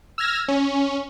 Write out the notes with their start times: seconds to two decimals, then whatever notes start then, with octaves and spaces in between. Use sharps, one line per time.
0.18 E6 F6 G#6 A#6
0.48 C#4